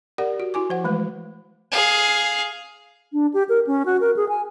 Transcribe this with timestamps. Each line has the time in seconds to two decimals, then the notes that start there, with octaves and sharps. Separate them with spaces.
0.18 G4 A#4 D5 F#5
0.40 F#4
0.54 E4 F#4 G#5 D6
0.70 F3 C5 F#5
0.84 E3 G#3 A3 B4
1.71 G#4 F5
3.13 D4
3.34 G4
3.49 A#4
3.67 C#4
3.86 F#4
4.01 A#4
4.17 G#4
4.29 G#5